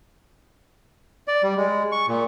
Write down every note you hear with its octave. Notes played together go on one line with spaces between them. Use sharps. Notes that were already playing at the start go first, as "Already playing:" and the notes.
D5
G3
G#3
C#6
A#2